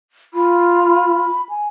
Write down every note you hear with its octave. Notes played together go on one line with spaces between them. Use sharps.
F4 B5
B5
G#5